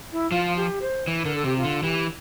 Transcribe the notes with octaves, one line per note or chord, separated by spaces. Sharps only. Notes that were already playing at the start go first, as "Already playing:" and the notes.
E4
F3 F4
G4
C5
E3
D3 A#4
A4
C3 G4
F4
D3
E3 G4